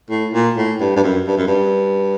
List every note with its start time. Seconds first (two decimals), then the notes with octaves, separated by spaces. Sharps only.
0.10 A2
0.34 A#2
0.57 A2
0.80 G2
0.96 G2
1.04 F#2
1.27 G2
1.38 F#2
1.47 G2